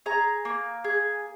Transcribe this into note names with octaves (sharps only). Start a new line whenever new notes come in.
G#4 A#5
A#3
G#4